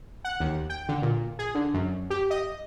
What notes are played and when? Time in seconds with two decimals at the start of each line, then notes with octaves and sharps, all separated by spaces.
0.24 F#5
0.40 D#2
0.70 G5
0.89 D3
1.02 A#2
1.39 G#4
1.55 D3
1.74 F#2
2.10 G4
2.31 D#5